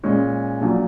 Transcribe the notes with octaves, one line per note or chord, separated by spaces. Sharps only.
A#2 G#3 C#4
A#1 A#2 F#3